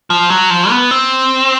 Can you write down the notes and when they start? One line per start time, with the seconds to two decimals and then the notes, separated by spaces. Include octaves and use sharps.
0.10 F3
0.30 F#3
0.50 F3
0.70 B3
0.91 C4